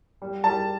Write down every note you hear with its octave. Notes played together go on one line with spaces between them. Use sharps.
G3
G3 A5